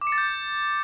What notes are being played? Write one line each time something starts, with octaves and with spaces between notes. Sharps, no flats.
D6
C#7
A6
G6